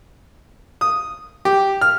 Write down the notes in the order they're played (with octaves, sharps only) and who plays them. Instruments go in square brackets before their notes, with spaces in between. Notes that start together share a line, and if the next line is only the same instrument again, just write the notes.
[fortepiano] D#6
G4
F6